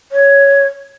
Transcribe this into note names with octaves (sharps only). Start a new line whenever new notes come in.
C#5